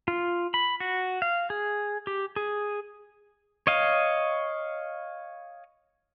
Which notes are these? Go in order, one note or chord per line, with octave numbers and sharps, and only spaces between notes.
F4
B5
F#4
F5
G#4
G4
G#4
C#5 D#5 F5